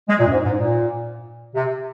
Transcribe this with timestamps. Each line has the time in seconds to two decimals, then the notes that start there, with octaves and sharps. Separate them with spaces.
0.07 G#3
0.19 A#2
0.26 F#2
0.31 G#2
0.44 G#2
0.56 A#2
1.54 C3